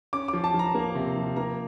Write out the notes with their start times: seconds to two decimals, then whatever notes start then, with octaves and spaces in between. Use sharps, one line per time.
0.13 C#4 D6
0.28 D6
0.33 F3
0.44 A5
0.54 F3
0.59 A#5
0.75 A#3
0.95 C3
1.16 F3
1.36 A#3 A#5